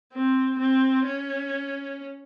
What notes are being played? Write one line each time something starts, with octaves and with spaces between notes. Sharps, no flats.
C4
C4
C#4